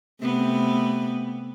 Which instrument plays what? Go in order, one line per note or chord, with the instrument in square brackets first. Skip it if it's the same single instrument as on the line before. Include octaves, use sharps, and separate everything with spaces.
[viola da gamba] C3 A3 B3